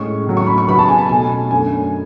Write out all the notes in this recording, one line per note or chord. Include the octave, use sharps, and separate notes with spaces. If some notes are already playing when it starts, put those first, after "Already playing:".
Already playing: A2 G#3 C#4 C#6
A2 F#3 C#4
C#6
B5
C#6
C#3 F#3 B3 B5
A5
G#5
A5
B2 A3 C#4 G#5
F#2 D3 A3 C#4 G#5